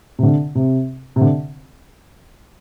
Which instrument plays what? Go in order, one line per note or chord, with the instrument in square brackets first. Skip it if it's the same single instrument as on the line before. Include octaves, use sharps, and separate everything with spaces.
[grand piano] C3
D3
C3
C3
D3